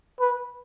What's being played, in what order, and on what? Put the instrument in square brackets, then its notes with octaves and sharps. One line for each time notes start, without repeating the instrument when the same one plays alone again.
[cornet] B4